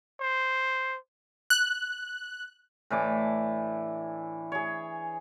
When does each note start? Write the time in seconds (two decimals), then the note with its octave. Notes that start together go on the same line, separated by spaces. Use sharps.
0.21 C5
1.50 F#6
2.90 A2 E3 D4 D6
4.52 G#4 C#5